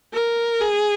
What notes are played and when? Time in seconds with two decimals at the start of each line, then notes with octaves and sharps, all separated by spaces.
0.13 A#4
0.60 G#4